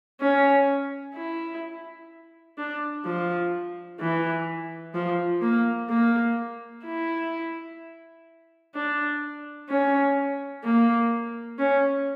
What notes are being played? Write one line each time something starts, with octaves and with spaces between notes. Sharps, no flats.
C#4
E4
D4
F3
E3
F3
A#3
A#3
E4
D4
C#4
A#3
C#4